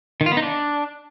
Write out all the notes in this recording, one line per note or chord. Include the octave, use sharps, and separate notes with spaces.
D#3
F4
B3
D#4
D4